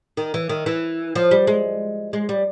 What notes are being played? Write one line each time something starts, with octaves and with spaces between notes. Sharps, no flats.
D#3
E3
D#3
E3
F3
G3
G#3
G#3
G3